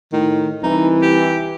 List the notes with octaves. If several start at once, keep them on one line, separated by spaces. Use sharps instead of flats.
A2 D#3
C2 E3 D#4
G4